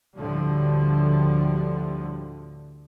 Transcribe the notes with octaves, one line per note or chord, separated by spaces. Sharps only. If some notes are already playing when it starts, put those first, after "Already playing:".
D2 A2 D3 F3 G3